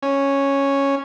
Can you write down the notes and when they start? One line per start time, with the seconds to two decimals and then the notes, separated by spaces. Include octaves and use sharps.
0.03 C#4